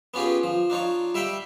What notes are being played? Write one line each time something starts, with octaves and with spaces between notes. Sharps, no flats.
B3 C#4 F4 G4 G#4
F3
D4 D#4 F4 C#5
G3 E5 F5 G5 B5